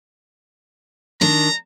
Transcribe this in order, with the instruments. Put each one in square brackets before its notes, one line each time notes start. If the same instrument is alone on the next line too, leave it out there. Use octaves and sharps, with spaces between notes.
[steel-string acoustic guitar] D#3 D4 [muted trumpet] A#5